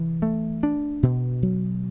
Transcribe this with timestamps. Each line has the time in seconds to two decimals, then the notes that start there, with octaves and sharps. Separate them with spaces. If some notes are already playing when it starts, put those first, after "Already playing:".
Already playing: C3 E3
0.22 A3
0.63 D4
1.03 B2
1.43 F#3